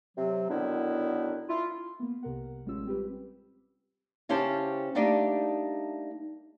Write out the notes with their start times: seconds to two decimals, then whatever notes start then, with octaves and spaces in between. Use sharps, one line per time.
0.17 C3 F#3
0.49 F#2 D3 D#3 B3 D4 E4
1.49 E4 F4
2.00 A#3 B3
2.23 C2 C3 A#4 F#5
2.65 A1 G3 G#3 C#4 F4 E6
2.87 C4 G4 B4
4.29 C#3 C#4 E4 G4 C5 A5
4.95 G3 A3 A#3 D4 D#4 G4